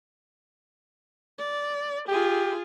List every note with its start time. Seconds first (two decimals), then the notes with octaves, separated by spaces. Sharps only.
1.39 D5
2.08 F4 G4 G#4